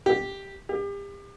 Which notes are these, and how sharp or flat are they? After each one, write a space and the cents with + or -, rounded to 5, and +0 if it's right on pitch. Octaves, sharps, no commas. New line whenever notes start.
G4 +0
G4 +35